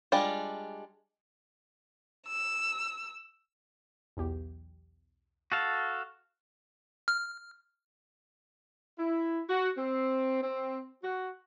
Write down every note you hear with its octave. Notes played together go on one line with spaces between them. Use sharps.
G3 G#3 D4 F4
E6
B1 E2 G4
F#4 A4 F5
F6
E4
F#4
C4
C4
F#4